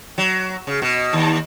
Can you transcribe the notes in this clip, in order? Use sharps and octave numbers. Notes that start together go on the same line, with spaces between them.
F#3
C#3
B2
D#2